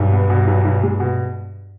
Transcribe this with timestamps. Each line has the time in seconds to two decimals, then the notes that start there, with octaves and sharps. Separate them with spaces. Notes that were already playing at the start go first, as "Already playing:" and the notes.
Already playing: B1 G2
0.12 B3
0.30 B2
0.48 B1
0.65 B1
0.83 G#3
1.00 B2